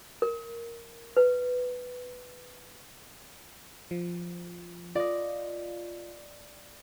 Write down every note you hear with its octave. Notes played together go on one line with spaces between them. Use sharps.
A#4
B4
F3
F4 D5 D#5